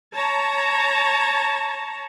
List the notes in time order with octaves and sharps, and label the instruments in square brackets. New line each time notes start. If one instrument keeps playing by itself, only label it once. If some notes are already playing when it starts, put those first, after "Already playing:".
[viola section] C#5 A5 A#5